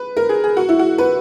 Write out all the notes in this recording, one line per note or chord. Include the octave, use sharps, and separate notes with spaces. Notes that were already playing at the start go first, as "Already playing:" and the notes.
Already playing: B4
A#4
G#4
G#4
F#4
E4
F#4
B4